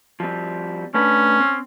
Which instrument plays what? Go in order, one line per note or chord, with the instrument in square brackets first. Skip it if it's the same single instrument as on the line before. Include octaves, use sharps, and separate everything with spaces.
[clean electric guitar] F3 G3 C4
[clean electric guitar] A3 D4 B4 [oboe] C#4
[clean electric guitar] C4